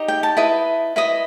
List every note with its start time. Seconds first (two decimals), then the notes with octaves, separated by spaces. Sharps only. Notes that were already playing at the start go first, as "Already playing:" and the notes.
Already playing: D#4 G4 D#5
0.08 G5
0.23 A5
0.37 E4 B4 D#5
0.96 E4 B4 D#5